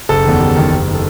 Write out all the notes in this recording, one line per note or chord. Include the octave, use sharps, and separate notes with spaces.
F#1 A4
E2 D#3
F#1 G4
E2 D#3
F#1
D#3
A4